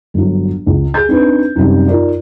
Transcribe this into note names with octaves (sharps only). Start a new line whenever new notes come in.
G1 F#3
C#2
G#4 G6 G#6
C4 D4 D#4 B4
F#2 C3 G3 D#4
D#4 F4 A#4 D5